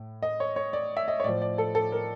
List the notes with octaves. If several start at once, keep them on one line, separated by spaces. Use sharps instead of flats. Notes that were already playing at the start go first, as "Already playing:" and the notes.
Already playing: A2
D#5
C#5
C#5
D5
E5
D#5
C#5
A2 F3 D5
D5
A4
A4
A#4